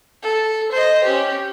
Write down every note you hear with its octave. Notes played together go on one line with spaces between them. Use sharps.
A4
C5 D#5
C#4 G4